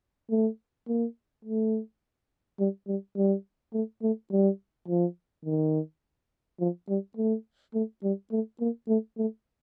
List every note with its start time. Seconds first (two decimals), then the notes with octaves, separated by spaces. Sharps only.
0.30 A3
0.88 A#3
1.45 A3
2.59 G3
2.88 G3
3.17 G3
3.74 A3
4.02 A3
4.31 G3
4.88 F3
5.45 D#3
6.60 F3
6.89 G3
7.17 A3
7.74 A3
8.03 G3
8.32 A3
8.60 A#3
8.88 A3
9.18 A3